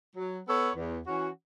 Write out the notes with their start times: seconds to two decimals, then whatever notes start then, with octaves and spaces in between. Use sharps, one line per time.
0.16 F#3
0.47 B3 A4 C#5
0.76 E2
1.07 E3 C#4 F#4